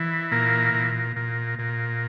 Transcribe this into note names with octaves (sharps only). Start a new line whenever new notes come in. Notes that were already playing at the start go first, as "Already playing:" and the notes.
Already playing: E3
A#2 A#3
A#2
A#2
A#2